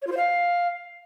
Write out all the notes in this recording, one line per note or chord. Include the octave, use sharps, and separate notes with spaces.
C#5
F4
C5
F5